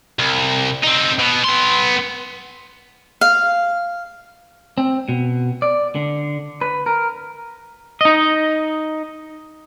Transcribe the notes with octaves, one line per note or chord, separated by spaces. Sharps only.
C2
C4 D#4
B2
B3 C6
F5
C4
B2
D5
D3
B4
A#4
D#4 D#5